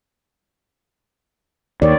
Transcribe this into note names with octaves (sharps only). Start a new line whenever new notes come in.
D#2 C#5 D5